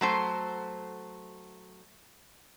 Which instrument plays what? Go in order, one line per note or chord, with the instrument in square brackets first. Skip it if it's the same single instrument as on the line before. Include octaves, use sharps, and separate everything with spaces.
[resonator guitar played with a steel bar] F#3 A3 C5